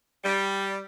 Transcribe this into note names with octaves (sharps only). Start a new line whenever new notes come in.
G3